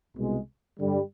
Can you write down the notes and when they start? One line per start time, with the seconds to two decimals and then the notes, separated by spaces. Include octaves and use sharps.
0.15 C2 B2 G#3
0.79 G2 D3 G3